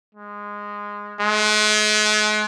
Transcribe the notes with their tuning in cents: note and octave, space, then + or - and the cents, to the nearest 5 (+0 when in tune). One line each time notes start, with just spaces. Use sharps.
G#3 -10
G#3 +40